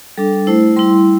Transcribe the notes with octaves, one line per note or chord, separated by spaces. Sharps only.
G3 D4 A4
A3 E4 C5
G3 E4 C6